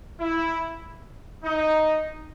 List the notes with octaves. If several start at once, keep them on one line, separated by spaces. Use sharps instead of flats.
E4
D#4